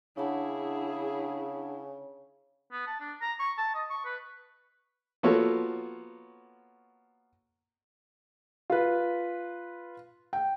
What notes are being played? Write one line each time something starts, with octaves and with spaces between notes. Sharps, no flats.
C#3 D4 E4 G#4 F#5 A5
B3
A5
D4
A#5
C#6
A5
D#5
C#6
B4
F3 A#3 B3 F#4 A4 C#5
F4 B4
G5